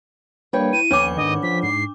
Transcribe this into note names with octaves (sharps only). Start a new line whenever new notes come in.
G3 A#3 D4 B4 C#5 G5
E4 D#7
D#2 D3 F3 B3 C#4 D4 D6
G#2 D#3 D#5
F3 B6
G#2 C7